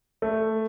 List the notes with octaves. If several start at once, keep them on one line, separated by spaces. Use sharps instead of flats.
A3